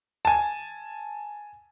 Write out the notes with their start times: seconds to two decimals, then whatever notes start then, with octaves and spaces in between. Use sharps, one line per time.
0.25 G#5 A5